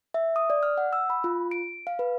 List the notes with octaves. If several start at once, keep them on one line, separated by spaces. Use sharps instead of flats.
E5
D#6
D5
F6
F#5
E6
B5
F4
D7
F5
B4